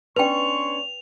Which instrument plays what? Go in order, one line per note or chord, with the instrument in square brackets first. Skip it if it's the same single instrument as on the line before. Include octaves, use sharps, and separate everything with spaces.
[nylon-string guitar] B3 C#4 D4 [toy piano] B4 G5 [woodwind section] C6 C#6 [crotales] F7